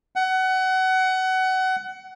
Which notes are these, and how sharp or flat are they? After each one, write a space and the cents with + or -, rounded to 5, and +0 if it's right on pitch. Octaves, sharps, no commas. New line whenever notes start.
F#5 +25